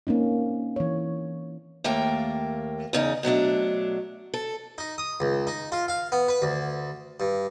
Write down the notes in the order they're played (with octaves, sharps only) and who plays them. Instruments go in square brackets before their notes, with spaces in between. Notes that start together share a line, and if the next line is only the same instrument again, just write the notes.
[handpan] A#3 C4 C#4 D#4
E3 C#5
[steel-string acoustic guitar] D#2 A3 A#3 G5
E2 C#3 D#4
B2 F#3 A3 D4
A4
[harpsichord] D#4
D#6
C#2
D#4
F4
F5
B3
B4
D2
G2